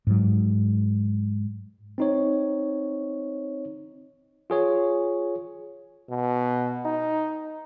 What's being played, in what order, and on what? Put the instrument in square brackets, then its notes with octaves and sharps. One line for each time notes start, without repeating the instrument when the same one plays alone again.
[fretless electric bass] G#2 F#3
[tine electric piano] C4 D#4 C#5
F4 G#4 C#5
[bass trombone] B2
D#4